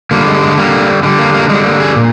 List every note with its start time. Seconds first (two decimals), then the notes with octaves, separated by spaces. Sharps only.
0.11 D3 G3 A#3
0.26 G#3
0.42 G#3
0.57 D3 G3 A#3
1.03 D3 G#3
1.06 G3
1.19 A#3
1.34 A#3
1.49 D3 G3 G#3
1.65 A#3
1.80 G#4
1.96 A#2